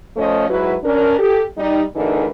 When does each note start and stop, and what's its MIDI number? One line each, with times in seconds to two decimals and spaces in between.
0.16 0.49 53
0.16 0.49 57
0.16 0.49 61
0.16 0.49 69
0.16 0.49 72
0.16 0.49 75
0.50 0.75 44
0.50 0.75 54
0.50 0.75 64
0.50 0.75 66
0.50 0.75 71
0.84 1.16 61
0.84 1.16 62
0.84 1.16 70
1.19 1.42 67
1.19 1.42 69
1.57 1.81 55
1.57 1.81 63
1.95 2.27 38
1.95 2.27 50
1.95 2.27 52
1.95 2.27 63
1.95 2.27 68
1.95 2.27 70